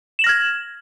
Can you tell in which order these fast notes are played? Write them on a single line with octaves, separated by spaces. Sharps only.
E7 F#7 A#6 F6 G#6